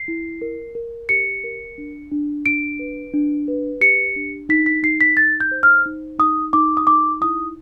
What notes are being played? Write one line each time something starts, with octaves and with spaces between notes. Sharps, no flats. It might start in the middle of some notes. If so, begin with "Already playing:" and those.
Already playing: C7
E4
A#4
A#4
G4 C#7
A#4
D4
D4
D4 D7
B4
D4
B4
G4 C#7
D4
D#4 B6
B6
D#4 C7
B6
D#4 A6
G6
C5
F6
D#4
D#4 D#6
D#4 D6
D#6
D#4 D6
E4 D#6